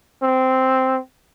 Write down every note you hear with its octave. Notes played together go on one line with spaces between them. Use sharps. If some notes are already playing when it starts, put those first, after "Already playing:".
C4